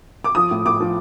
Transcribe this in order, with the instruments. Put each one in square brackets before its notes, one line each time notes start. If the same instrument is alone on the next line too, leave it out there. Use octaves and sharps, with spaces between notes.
[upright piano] D6
F3 D#6
A2
A2 D6
F3